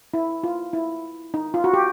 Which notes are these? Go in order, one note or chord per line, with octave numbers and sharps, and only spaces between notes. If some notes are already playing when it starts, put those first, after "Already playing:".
E4
F4
E4
D#4
F4
F#4
G4